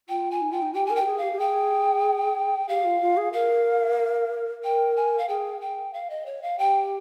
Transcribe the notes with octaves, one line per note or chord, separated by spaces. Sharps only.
F4 G5
G#5
D#4
F4 G5
D#4
G4 G5
A#4 G#5
G5
G4
G#4
G4 F5
G4
G#4 G5
G4 F5
F4
F4
G#4
A#4 F5
A#4 G5
G#5
F5
G#4 G5
G5
F5
D#5
C#5
F5
G4 G5